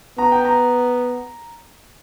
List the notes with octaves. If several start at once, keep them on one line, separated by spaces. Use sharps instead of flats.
B3 A#5
G5
A#5